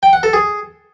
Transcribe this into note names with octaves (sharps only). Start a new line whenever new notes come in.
G5
F#5
A4
G#4